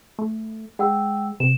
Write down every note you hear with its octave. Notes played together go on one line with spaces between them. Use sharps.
A3
G#3 F#5 G5 E6
C3 E7